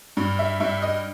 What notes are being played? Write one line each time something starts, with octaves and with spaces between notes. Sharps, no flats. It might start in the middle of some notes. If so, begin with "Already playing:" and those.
G2
E5
G2 E5
D#5